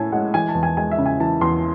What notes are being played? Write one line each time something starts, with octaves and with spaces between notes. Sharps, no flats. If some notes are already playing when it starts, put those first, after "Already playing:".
Already playing: A2 C#4 E4 G#5 A5
G#3 F#5
E3 G#5
A5
E2
G#5
G#3 G#5
E5
C#3
G#5
E3 A5
E2 C6